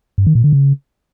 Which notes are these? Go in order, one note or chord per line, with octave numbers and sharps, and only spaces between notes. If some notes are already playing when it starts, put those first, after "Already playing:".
G2
D#3
A#2
D3
C#3